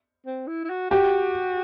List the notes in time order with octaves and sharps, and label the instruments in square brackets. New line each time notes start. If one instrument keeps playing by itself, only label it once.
[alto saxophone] C4
E4
E4
F#4
[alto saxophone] F#4 [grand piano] G4